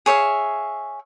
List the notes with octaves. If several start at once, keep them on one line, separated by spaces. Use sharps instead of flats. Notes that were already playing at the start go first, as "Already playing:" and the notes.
G#4 C#5 E5 F5